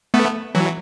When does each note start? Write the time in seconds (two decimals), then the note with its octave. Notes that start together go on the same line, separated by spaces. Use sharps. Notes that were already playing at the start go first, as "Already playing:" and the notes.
0.14 A3 B3
0.55 E3 F#3